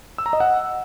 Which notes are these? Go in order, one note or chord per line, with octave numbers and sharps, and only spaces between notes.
E6
A#5
D#5
F#5